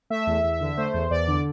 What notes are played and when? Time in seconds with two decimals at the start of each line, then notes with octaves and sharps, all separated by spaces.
0.10 A3 E5
0.27 E2
0.44 E2
0.61 D3
0.77 A3 C5
0.94 E2
1.11 E2 D5
1.28 D3